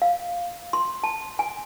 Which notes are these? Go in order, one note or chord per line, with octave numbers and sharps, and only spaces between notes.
F5
C6
A5
G#5